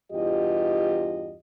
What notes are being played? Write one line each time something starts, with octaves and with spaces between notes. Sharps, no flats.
E2 G2 F4 G4 D#5